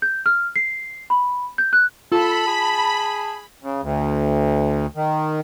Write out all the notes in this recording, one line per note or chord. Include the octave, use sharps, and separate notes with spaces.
G6
F6
C7
B5
G6
F#6
F4 A4 A5 B5
G#4
C#3
D2
D#3